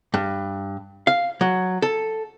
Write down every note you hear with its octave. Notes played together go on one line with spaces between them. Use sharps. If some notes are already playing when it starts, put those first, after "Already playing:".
G2
F5
F#3
A4